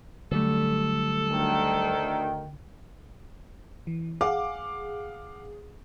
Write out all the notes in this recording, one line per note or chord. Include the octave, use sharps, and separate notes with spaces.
D3 F#3 G3 A3 A4
D2 D#3 G5
E3
G#4 F5 F#5 D6